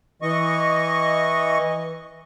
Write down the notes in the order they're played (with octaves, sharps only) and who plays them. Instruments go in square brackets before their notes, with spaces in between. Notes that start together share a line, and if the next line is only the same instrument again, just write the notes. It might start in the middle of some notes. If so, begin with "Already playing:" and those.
[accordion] E3 D#5 C#6